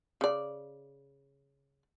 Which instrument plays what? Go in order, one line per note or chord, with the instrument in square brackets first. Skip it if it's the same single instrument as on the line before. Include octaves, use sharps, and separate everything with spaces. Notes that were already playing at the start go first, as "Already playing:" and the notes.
[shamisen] C#3 D5